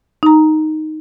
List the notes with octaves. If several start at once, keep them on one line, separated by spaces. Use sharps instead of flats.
D#4 A#5